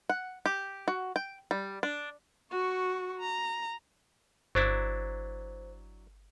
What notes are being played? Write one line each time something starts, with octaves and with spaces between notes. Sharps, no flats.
F#5
G4
F#4
G5
G3
D4
F#4 C#6
A#5
G1 F#3 D4 E4 C5